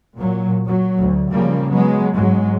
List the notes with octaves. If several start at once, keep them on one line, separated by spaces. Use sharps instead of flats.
A#2 F#3
F#3
D2
C#3 F3 G3 A#3
F#3 G#3 B3
G#2 F#3 G#3